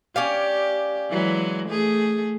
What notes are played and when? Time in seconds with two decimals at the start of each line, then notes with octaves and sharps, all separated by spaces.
0.16 C#4 G4 D5 F5
1.10 E3 F#3 G#3
1.69 A3 G#4